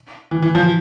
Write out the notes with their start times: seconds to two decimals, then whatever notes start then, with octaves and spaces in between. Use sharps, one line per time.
0.31 E3
0.42 E3
0.55 F3